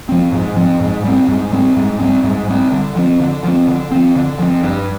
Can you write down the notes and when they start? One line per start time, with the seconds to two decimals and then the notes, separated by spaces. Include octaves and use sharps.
0.09 F3 C4
0.32 G#2
0.56 F3 C4
0.80 G#2
1.04 G3 C4
1.28 G#2
1.52 G3 C4
1.76 G#2
2.00 G3 C4
2.24 G#2
2.48 G3 C4
2.72 D3
2.96 F3 C4
3.20 D3
3.44 F3 C4
3.67 D3
3.91 F3 C4
4.16 D3
4.39 F3 C4
4.63 G2